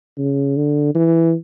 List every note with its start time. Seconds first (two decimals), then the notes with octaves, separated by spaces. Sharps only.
0.18 C#3
0.57 D3
0.95 E3